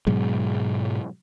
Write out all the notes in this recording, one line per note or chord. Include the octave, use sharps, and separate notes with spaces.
G#2 B2 F#3 G#3